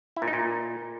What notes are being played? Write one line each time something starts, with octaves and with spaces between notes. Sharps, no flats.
E4
A#2
D#4
A#2